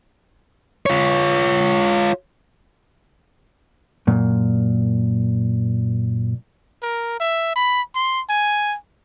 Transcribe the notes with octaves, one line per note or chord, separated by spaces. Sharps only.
F4 C#5
F#2 A#2
A#4
E5
B5
C6
G#5